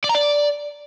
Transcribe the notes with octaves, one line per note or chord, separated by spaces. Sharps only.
D5
A#5
D5